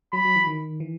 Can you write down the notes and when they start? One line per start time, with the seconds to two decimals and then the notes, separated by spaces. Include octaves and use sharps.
0.13 F#3 B5
0.25 F#3
0.36 E3
0.47 D#3
0.80 E3